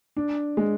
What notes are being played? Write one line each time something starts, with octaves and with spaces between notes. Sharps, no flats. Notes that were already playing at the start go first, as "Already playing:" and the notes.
D4
G#3